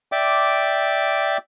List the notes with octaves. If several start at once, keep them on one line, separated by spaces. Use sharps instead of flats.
D5 E5 G5 D6